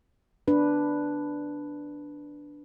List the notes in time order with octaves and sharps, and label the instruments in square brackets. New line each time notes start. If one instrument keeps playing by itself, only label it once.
[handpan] D4 B4